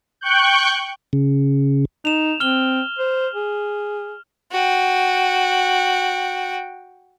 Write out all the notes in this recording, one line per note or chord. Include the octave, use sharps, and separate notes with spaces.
G5 C#6 F#6 G6
C#3
D#4 E7 F7
C4 F6 G7
C5
G#4
F#4 G5